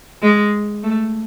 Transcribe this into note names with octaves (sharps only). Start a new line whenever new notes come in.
G#3
A3